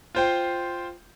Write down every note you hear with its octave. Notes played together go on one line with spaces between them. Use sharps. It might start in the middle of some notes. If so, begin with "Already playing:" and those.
F4 C5 G5